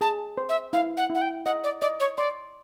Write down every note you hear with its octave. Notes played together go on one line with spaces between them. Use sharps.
G#4 A5
C5
E5
E4 F5
F#5
E4 F#5
G5
D#5 F#5
D5
D5 D#5
C#5
D5 C6